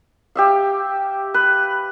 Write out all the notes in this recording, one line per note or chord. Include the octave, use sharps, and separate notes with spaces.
G4 E5 F5
B4